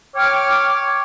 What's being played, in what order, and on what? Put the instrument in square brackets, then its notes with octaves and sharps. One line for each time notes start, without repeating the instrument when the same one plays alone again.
[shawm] C#5 [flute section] G5 D6 F6